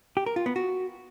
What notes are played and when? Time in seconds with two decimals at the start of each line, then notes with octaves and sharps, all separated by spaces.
0.17 G4
0.26 A#4
0.36 F4
0.46 B3
0.56 F#4